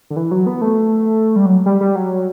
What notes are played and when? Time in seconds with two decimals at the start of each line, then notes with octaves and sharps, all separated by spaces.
0.10 D3
0.16 E3
0.31 F#3
0.47 B3
0.61 A3
1.36 G3
1.46 F#3
1.66 G3
1.81 G3
1.96 F#3